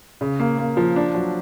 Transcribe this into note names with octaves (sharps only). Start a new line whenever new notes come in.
C#3
A#3
A#3
F3
D4
F#3